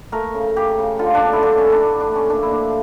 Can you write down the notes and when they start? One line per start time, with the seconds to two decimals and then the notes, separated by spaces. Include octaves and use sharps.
0.12 A3 A#4
0.34 C#3
0.56 C#3 G4
0.78 C#3
0.99 D3 F4
1.15 D4
1.21 D3
1.33 E4
1.43 D3 D4
1.58 C#4
1.64 D3
1.72 D4
1.86 A3
2.00 D4
2.08 A3
2.16 C#4
2.30 A#2 D4
2.42 E4
2.51 F3 D4